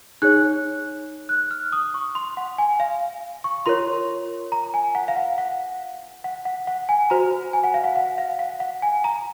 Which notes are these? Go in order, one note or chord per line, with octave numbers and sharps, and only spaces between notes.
D#4 G#4 C#5 F#6
F#6
F6
D#6
C#6
C6
F#5
G#5
F5
C#6
F4 A#4 C#5 C6
A#5
G#5
F#5
F5
F#5
F#5
F#5
F#5
F#5
G#5
F#4 C5 A#5
G#5
F#5
F5
F#5
F#5
F5
F#5
F#5
G#5
A#5